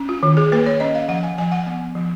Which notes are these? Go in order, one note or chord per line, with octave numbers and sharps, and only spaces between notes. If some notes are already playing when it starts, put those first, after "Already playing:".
Already playing: C#4
F4
D#3
G#4
A#3 B4
C#5
C#4 D#5
F5
F3 F#5
G#5
F3 G#5
F#5
B3
F3